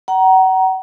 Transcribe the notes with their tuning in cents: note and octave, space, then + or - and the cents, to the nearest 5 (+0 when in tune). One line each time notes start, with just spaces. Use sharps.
F#5 +35 A#5 +10